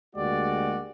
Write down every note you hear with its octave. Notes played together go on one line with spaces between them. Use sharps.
D2 G#3 A#3 F#4 G4 D5